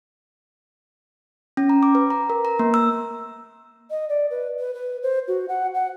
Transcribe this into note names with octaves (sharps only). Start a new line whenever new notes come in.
C#4
A#5
D6
B4
A#5
A#4
A#5
A#3
E6
D#5
D5
B4
B4
B4
C5
F#4
F#5
F#5